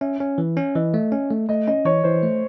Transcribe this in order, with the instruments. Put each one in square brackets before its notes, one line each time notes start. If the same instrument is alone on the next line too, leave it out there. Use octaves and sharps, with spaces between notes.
[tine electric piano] C#4 [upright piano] E5
[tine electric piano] C#4
E3
C#4
[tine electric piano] E3 [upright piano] D#5
[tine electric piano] A3
C#4
A3
[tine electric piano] A3 [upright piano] D#5
[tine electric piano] C#4 [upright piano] D#5
[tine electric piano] E3 [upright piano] C#5
[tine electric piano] E3 [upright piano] C5
[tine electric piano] A3